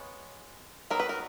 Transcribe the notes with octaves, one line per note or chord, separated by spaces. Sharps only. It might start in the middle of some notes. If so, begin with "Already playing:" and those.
Already playing: G#3 B3 C#5
D#3 F#3 B3 A#4
B4
A#4